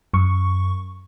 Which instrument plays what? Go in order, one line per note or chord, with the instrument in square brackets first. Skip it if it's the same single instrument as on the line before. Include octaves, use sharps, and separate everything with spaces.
[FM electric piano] F#2 C#6